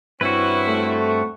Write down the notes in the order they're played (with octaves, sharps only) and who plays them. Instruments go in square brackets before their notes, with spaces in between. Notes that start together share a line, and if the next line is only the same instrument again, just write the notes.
[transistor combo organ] G2 C4 [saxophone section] E3 C#4 E4 [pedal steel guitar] F#4 B4
[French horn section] A3